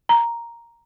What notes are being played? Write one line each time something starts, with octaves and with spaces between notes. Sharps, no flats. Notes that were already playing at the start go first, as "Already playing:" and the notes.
A#5